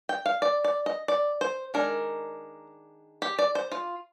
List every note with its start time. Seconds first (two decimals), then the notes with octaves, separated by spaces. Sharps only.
0.09 G5
0.26 F5
0.42 D5
0.64 D5
0.86 D#5
1.08 D5
1.41 C5
1.74 D#3 G#3 D4 A#4
3.22 G4
3.39 D5
3.55 C5
3.72 F4